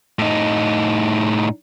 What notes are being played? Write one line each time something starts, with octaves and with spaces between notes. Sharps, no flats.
A2 D#4